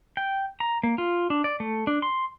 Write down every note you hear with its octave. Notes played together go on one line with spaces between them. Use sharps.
G5
A#5
A#3
F4
D4
D5
A3
D4
C6